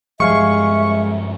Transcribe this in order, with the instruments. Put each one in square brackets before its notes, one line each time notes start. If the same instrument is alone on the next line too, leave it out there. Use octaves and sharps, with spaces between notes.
[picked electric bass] G2 F3 G3 [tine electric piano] G#3 F5 G#5 [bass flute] E5 [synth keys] C#6